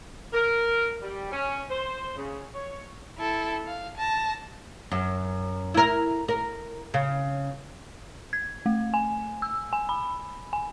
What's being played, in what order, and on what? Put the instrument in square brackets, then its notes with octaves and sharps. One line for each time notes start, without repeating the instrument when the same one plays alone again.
[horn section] A#4
G3
C#4
C5
C#3
C#5
[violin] E4 A4
F5
A5 A#6
[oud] F#2
E4 A#4
A#4
C#3
[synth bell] G#6
A3
G#5
E6
G#5
B5
G#5